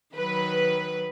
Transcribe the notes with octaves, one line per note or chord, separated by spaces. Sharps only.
D#3 F#3 B4